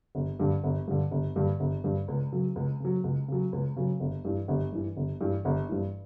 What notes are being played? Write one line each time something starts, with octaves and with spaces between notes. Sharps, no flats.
G1
G2 D3
G1
G2 D3
G1
G2 D3
G1
G2 D3
C#2
C#3 F#3
C#2
C#3 F#3
C#2
C#3 F#3
C#2
C#3 F#3
G1
G2 E3
G1
G2 E3
G1
G2 E3
G1
G2 E3